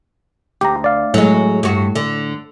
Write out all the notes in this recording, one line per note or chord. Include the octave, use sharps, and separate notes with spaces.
D2 G4 A#5
D5 F5
A2 F#3 G#3
G2 F#4
D3